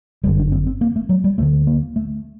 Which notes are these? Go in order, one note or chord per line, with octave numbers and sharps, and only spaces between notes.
G1 F#2 D3 G3
D4
C4
C4
A#3
A3
F#3
G3
D2 D3 A3
A#3
A3